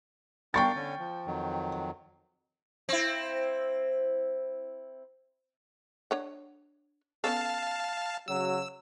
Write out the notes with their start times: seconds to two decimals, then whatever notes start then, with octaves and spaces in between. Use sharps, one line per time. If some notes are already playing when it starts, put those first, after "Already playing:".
0.54 D4 A#4 F5 G5 C#6 A6
0.76 D3 C#4 G#5
0.99 F3
1.26 F2 D#3 F#3
2.89 C4 E4
6.11 D4 C#5 F#5
7.24 B3 C#4 A4 F5 A5
8.28 C#3 F#3 E6